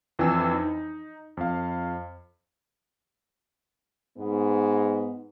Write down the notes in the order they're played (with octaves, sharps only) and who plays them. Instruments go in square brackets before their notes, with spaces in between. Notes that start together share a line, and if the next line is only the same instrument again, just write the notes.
[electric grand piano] F2 E3 D4 G5 G#5 E6
D#4
F2 F5
[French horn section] G#2 B3